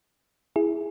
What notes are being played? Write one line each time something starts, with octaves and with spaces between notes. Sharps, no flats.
E4 G#4